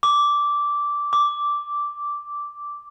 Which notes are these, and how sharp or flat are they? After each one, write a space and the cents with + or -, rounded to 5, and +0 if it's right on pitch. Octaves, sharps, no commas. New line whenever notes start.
D6 -10
D6 -5